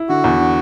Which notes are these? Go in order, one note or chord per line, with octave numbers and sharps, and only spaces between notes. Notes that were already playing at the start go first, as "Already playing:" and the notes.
Already playing: E4
D3 F#4
E2
D3